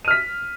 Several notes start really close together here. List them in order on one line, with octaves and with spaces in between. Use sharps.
D#7 F6 B6